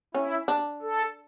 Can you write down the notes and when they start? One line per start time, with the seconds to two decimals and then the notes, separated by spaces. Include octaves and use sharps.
0.15 C#4 E4
0.48 D4
0.82 A4